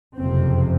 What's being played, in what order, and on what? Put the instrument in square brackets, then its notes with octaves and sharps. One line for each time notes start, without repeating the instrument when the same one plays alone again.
[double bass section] F#1 F2 C3 C4